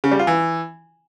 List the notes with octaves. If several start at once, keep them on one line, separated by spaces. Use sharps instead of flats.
C#3
G3
F4
E3